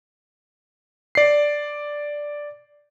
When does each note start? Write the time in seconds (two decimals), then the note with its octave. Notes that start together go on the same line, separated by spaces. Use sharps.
1.15 D5 C7